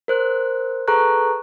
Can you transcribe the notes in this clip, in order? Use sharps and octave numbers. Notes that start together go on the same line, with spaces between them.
A#4 C5 F#6
G#4 A4 B4 A#5 C#6 F#6